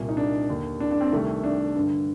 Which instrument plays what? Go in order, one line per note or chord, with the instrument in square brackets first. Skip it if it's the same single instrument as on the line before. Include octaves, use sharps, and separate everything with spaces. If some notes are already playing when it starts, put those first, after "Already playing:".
Already playing: [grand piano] C2 A#2
D#4
D4
D#2 D3
D4
D4
C4
C2 C3 D#3 A3
D4
G2 D3